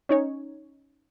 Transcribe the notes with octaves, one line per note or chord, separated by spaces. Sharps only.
C#4 D#4 C#5